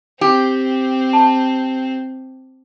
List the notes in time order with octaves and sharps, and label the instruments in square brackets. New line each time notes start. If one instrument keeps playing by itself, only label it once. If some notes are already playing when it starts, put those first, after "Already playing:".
[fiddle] C4 [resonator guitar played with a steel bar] G4
[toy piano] A5